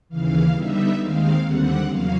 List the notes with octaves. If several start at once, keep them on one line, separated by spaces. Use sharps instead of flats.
D#2 C#3 E3 F5
D3 G3 B3 D#4 E5
D#2 D#3 G#3 C4 F5
D#2 D3 G3 C4 F#5
E2 C#3 F#3 A#3 F5